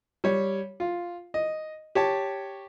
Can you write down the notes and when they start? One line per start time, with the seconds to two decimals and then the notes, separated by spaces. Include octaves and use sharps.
0.24 G3 C#5
0.80 F4
1.34 D#5
1.95 G4 C#5 A5